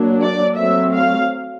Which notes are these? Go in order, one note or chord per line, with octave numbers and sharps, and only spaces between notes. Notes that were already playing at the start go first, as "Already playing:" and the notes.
Already playing: F#3 A#3 D4
D5
F#3 A3 C4 E5
F5